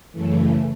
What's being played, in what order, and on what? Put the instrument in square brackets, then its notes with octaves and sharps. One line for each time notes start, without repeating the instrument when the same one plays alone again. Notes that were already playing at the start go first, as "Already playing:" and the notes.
[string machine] F#2 C#3 E3 A3